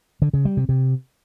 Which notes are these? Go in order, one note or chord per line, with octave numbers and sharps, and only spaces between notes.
D3
C#3
G3
C3
C3